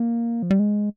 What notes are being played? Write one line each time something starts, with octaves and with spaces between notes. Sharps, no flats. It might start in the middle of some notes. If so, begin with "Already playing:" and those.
Already playing: A#3
F3
G3
G#3